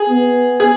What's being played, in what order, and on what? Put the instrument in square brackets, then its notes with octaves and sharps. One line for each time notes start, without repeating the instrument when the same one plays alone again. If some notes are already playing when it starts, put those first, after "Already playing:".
Already playing: [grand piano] G#4
[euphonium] B3
[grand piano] G#4